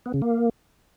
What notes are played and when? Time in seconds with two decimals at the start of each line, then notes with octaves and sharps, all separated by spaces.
0.06 B3
0.14 C#3
0.22 A#3